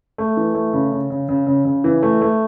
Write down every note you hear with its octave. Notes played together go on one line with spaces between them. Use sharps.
A3
E3
A3
C#3
C#3
C#3
C#3
C#3
C#3
E3
A3
A3